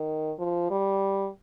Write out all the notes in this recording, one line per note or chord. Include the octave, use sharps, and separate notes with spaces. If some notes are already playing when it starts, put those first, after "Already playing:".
Already playing: D#3
F3
G3